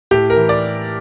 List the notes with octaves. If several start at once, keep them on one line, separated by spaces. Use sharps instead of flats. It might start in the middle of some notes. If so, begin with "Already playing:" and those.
A2 G4
A#4
E3
D5